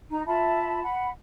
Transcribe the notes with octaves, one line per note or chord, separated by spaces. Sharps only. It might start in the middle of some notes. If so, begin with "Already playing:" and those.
D#4 A#5
F4 E5 A5 B5
F#5 B5